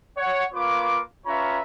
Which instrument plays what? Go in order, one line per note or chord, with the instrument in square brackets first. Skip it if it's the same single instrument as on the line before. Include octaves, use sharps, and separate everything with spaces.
[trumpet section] C#5 F#5
A#3 F4 B4 C#5 D6
C#4 F4 B4 C#5 E5 A#5